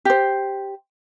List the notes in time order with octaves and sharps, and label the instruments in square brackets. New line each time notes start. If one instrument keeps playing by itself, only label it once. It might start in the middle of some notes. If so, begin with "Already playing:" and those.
[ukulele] G4 C5